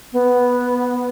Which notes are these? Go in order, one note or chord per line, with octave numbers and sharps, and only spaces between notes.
B3